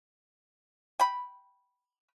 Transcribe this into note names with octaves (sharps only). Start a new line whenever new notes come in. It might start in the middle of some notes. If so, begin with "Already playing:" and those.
G5 B5